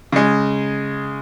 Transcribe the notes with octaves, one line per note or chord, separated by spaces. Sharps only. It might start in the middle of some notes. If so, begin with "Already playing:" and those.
C#3 G#3